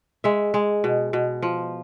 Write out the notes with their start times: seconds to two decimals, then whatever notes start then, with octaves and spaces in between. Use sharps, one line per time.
0.24 G#3 E5
0.54 G#3
0.84 B2
1.13 B2
1.43 F3